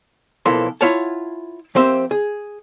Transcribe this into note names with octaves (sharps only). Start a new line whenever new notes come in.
B1 E3 F3 A#3 A4 C6
E4 F4 C#5 F5 F#5 A5
F3 A#3 C4 G4 C5 E5
G#4